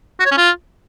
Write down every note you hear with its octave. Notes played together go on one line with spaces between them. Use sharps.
F#4
C#5
C#4
F4